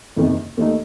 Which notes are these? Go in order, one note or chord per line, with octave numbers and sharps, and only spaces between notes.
F#1 E2 C3 D#3
D#2 D#3 A3 D#4